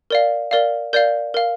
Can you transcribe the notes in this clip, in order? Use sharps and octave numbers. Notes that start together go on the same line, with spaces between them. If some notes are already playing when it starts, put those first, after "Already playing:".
A#4 D5 F5
A#4 D5 F5
A#4 D5 F5 G6
A#4 F5